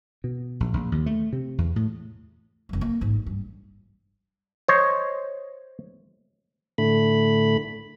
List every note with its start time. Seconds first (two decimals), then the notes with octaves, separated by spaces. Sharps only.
0.24 B2
0.60 A#1
0.73 A#1
0.92 D#2
1.06 A3
1.33 C3
1.58 E2
1.76 A2
2.69 F1 G3
2.81 A#3
3.01 A1 G#2
3.26 G2
4.68 C5 C#5 D#5
6.78 A2 D3 A3 B5